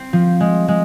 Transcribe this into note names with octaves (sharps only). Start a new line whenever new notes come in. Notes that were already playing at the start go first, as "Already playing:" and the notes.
Already playing: C4
F3
G#3
G#3